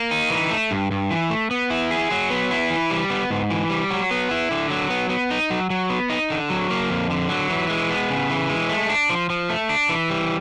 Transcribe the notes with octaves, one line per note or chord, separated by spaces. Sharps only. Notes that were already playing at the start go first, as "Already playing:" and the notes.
Already playing: A#3
D#4
E3
A3
G2
G2
E3
A3
B3
E4
G#4
F#3
B3
E4
E3
G3
B3
G#2
E3
G3
F#3
B3
E4
D3
F#3
B3
B3
D#4
F#3
F#3
B3
D#4
D3
F#3
A#3
F2
D3
F#3
E3
G#3
B3
C#3
E3
G#3
A3
D4
F3
F3
A3
D4
E3
G3